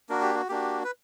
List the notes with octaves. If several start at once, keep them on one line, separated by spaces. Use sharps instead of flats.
A#3 D4 F#4 A#4
G4
F#4
A#3 D4 F#4 G4
B4